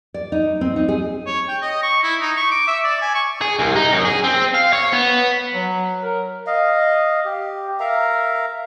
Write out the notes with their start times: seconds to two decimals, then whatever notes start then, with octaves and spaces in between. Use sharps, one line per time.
0.14 D5
0.32 D#4
0.61 C4
0.76 D#4
0.89 G#4
1.26 C#5
1.48 G5
1.62 D#5
1.83 C#6
2.03 E4
2.21 D#4
2.37 C#6
2.51 D6
2.67 E5
2.84 D5
3.02 G#5
3.15 C#6
3.41 G#4
3.59 C2
3.76 D#4
3.93 F#2
4.05 G#4
4.24 C4
4.55 F5
4.73 C#5
4.93 B3
5.54 F#3
6.03 A#4
6.47 D#5 F5
7.25 G4
7.80 A#4 E5 F5 A#5